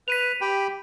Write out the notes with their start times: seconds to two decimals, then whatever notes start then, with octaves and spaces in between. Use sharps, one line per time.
0.08 B4 B6 D#7 F7
0.41 G4 G5 B5